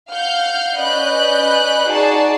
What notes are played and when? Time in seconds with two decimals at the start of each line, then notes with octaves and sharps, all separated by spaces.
0.12 F5 F#5 F6 G6
0.77 C#4 B4 D5 D#5 F#6 G6
1.87 D#4 F#4 G#4 D5 A5